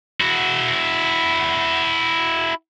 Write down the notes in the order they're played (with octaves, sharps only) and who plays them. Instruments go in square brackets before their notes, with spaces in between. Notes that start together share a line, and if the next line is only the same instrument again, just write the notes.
[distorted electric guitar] E4 F#4